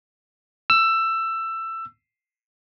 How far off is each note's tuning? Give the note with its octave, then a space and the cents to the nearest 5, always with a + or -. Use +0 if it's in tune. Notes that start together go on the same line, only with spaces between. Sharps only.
E6 +15